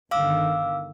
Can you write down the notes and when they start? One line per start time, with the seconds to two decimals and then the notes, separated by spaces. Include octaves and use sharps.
0.11 G1 D3 D#3 F5 D6 E6